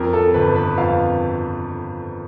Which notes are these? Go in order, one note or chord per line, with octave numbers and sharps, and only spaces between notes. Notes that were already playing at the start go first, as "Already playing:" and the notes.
Already playing: F2 A#4
A4
G1 B4
B4
F2 F5